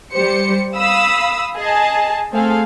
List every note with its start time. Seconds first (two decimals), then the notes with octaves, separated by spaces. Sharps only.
0.13 G3 G4 C5 C#7
0.77 F5 B5 D#6 E6
1.56 G#4 D#5 G#5 A5
2.31 A3 C4 G#4 A4 F5